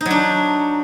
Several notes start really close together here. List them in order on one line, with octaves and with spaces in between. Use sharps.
D#4 F#3 D4